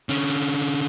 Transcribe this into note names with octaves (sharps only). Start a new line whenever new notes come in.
D3 C#4